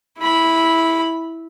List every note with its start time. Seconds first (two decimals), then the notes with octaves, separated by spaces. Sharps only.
0.19 E4 B5